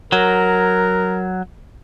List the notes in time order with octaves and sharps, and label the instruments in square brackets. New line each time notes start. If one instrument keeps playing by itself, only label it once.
[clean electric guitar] F#3 [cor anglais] A#4